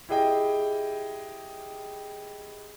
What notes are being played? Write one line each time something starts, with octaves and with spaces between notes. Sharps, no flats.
E4 G4 G#4 D#5 G5